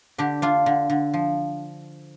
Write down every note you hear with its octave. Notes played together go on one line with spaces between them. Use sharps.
D3 D4 G4
D4 F4
D3
D3
F3